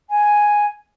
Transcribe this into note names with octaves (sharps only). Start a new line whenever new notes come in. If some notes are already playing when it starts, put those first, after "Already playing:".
G#5